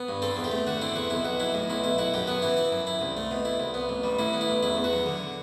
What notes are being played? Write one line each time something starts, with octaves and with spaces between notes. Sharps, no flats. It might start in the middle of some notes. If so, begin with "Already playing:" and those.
Already playing: B3
G2
C4 A4
E2
G4
A3
D3 F#4
C4 E4
E2 F#4
B1 E4
B1 F#4
F#3 E4
A2
B1 E4
B1 E4
E4 F#4
F#2 G4
B3 F#4
E3 E4
E4
F#2
E4
C2
A3
B2
E4
C2
B3
A1
G3
A2 E4
B3
E4
A1
E2 E4
E2
F#4
F#3
D3